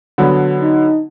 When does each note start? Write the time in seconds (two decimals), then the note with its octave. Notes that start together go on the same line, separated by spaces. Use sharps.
0.18 D3 F#3 B3
0.62 D#4